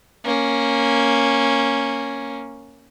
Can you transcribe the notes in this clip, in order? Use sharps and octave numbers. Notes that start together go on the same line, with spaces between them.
A#3 C#4